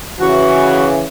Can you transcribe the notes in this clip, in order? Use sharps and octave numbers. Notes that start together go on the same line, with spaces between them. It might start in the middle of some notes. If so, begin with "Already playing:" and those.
C#3 E3 F#4